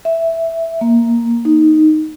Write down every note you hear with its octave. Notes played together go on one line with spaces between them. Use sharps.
E5
A#3
D#4